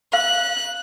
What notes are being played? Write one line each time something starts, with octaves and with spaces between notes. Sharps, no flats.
F5 F#6